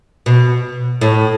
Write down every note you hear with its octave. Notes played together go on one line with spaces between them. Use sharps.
B2
A2